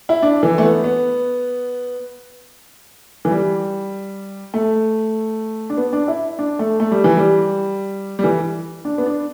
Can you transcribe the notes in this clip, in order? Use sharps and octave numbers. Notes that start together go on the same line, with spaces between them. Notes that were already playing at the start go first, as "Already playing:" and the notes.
E4
D4
E3
A3
B3
B3
E3
G3
A3
D4
B3
D4
E4
D4
A3
A3
G3
E3
G3
G3
E3
D4
B3
D4